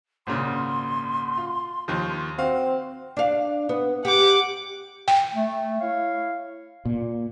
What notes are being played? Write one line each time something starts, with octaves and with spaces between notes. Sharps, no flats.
G#1 A#2 C#3 C6
F4
D#2 D#3 F3
C4 F#4 F5
D4 F5
B3
G4 F#5 D6
G5
A3
E4 C#5 F5
A#2